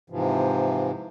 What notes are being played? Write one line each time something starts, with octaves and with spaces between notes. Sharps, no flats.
G#2 C3 E3 F3